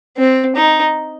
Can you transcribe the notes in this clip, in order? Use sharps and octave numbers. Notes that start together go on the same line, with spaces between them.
C4
D#4